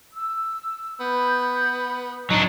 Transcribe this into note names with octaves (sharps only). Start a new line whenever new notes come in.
E6
B3 B5 G6
F#3 D4 D#4